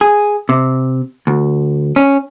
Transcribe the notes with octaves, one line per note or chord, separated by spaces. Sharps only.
G#4
C3
D2
C#4